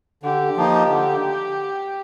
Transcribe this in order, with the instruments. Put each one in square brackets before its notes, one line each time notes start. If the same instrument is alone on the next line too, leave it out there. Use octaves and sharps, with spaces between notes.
[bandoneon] D3 [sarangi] G4
[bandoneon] F3 A#3 D#4
D3